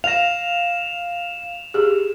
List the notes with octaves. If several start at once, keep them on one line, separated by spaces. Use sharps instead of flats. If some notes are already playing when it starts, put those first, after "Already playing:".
F5 A#6 E7 F7
G4 G#4